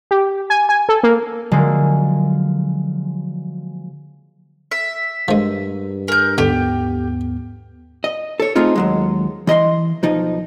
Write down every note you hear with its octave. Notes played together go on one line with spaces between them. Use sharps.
G4
G#5
G#5
A4
A#3
D3 F3 F#3 G#3 A#3
E5
G2 F3 G#3 A#4
A#4 G#5 G6
D#2 G#2 D3 B3 G4
D#5
A4 C#5
A3 C4 D#4 F4 G#4
D#2 F#3 G#3
E3 D#5 B5 C6
B1 F3 D#4